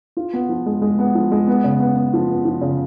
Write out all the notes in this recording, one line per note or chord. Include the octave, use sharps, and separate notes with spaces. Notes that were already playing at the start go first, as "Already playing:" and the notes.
F4
B3
F3
G#3
G#3
B3
F3
G#3
B3
C#3
B3
B3
F3
B3
F3
C#3